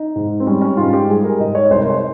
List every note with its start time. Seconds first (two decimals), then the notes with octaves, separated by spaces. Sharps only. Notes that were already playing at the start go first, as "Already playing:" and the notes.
Already playing: D#4
0.16 G#2
0.40 C4
0.47 G3 C#4
0.61 C#4
0.77 G#2 F4
0.93 G4
1.09 G3 G#4
1.24 A#4
1.39 G#2 D#5
1.55 C#5
1.70 C2 C5
1.80 A#4
1.90 C5